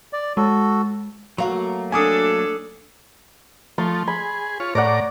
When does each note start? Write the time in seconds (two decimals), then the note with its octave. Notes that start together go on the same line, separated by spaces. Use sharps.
0.13 D5
0.37 G#3 F#4 A4
1.38 F#3 A3 A#3 F#4 F5 A#5
1.92 D4 A4 G#5 D6 D#6
3.78 F3 A3 C6 C#6
4.08 G#4 B5
4.60 F4 C#5
4.75 A2 C#5 D5 F#5 A#5 D6